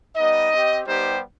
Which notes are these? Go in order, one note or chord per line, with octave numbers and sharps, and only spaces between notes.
G3 B3 D#4 D#5
C4 G4
G3 B3 D#4 G4 C5